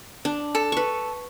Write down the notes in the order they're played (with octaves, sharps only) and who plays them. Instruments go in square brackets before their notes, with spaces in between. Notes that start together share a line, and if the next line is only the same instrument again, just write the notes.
[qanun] D4
[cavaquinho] A4
[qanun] B4 C#6